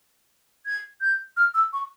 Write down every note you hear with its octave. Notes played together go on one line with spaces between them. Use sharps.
G#6
G6
F6
E6
C#6